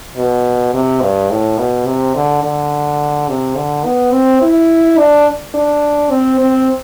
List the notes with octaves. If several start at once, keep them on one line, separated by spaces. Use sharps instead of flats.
B2
C3
G2
A2
B2
C3
D3
D3
C3
D3
B3
C4
E4
D4
D4
C4
C4